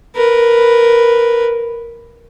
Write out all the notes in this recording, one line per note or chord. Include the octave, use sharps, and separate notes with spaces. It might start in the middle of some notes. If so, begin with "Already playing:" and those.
A#4 B4